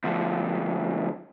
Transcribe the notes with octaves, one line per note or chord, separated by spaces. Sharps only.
D2 F3